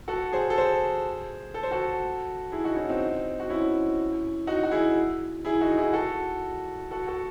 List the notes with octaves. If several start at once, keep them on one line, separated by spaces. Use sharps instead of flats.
F#4 A4
G#4 C5
A4
G#4 C5
A4
C5
F#4 A4
E4 G#4
D#4 F#4
C#4 E4
C4 D#4
F#4
C#4 E4
D#4 F#4
F#4
E4 G#4
E4 G#4
D#4 F#4
E4 G#4
F#4 A4
F#4 A4
F#4 A4